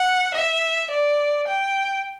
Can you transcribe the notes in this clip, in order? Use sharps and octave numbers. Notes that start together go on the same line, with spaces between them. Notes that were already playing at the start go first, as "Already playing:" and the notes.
Already playing: F#5
E5
D5
G5